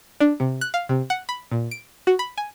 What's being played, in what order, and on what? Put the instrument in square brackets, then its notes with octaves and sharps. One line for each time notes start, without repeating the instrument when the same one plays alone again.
[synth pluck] D4
C3
F#6
F5
C3
F#5
B5
A#2
D7
F#4
B5
G#5